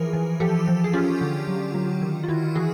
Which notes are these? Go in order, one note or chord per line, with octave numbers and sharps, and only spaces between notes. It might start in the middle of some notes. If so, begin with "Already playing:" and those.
Already playing: E3 F3 G#4 A#4
E3
F3 G4 A4
F3
G#4
C#4 F4 G4
D3
F#3
F#3
D#3
F4
D#3 E4 F#4
E3 F#4 G#4